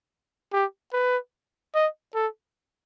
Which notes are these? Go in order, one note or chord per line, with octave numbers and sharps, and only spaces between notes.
G4
B4
D#5
A4